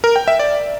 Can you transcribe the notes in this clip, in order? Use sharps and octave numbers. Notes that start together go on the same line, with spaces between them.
A#4
G5
E5
D5